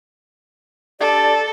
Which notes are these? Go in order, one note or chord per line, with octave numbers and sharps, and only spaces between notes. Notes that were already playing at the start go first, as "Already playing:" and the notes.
D4 G4 A4 D5